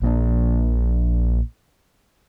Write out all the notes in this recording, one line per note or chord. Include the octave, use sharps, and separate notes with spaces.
A#1 A#3 D4